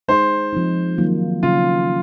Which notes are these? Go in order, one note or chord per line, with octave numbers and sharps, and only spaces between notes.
G#3 D#4 G#4 C5
F3 C4 D#4
D#3 F#3 A#3 F4
C#3 F#3 C#4 F4